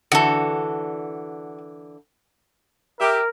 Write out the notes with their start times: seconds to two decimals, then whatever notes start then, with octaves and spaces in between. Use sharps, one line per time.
0.12 D3 E3 F#4 A4
3.00 G4 A#4 E5